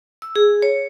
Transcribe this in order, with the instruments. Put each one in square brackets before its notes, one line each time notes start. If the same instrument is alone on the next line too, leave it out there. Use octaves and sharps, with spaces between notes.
[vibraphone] E6
G#4
C#5